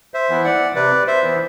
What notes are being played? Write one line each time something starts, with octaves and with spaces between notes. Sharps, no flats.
C5 E5
E3 B3 E4
D5 F#5
C3 B4 D5
C5 E5
E3 B3 E4